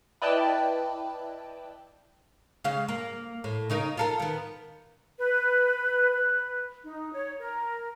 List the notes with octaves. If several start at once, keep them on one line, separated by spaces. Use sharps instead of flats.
E4 B4 D5 D#5 G5 A5
C#3 G#3 F5
A#3
A2
C#3 D#4 A#4
F4 A4 A#4
D#3 B3
B4
B4
D#4
C#5
A#4